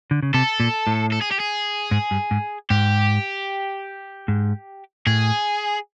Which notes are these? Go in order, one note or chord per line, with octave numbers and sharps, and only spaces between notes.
D3
C#3
C3 A4
A#2
A2
A4
G#4
G4
G#4
G#2
G2
G#2
G#2 G4
G#2
A2 G#4